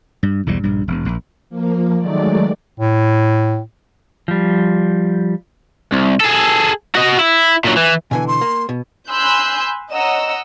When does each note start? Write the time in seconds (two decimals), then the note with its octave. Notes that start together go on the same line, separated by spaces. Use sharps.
0.23 G2
0.46 B1 E2 G#2 G3
0.63 A#1 G2
0.88 E1
1.05 E1 A#1
1.49 F3 A#3
1.98 D#3 F#3 G#3 A3 D5
2.80 A2
4.28 F3 G3
5.92 C2
6.20 G#4 A4
6.95 F#4 D#5
7.19 E4
7.65 A#2 F#3
7.77 E3
8.11 B2 D3 E3 G#5
8.28 C6
8.41 A#3
8.69 B2
9.09 G#5 B5 C6 E6 F#6 G6
9.91 C#5 D#5 F#5 A#5 E6